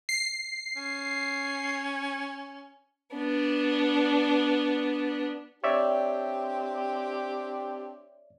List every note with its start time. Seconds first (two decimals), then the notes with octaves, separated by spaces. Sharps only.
0.09 C7
0.76 C#4
3.15 B3 D4
5.64 C4 D4 G4 C#5 D5 E5